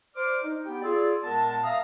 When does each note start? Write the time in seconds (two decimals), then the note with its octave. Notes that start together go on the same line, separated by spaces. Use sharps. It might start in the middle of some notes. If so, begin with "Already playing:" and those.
0.15 C5 D5 D6 F6
0.42 D#4
0.66 B3 G4 G5
0.82 F4 G#4 D5 E6
1.23 A#2 G#3 B3 A#4 A5
1.63 E5 F5 A#5 D#6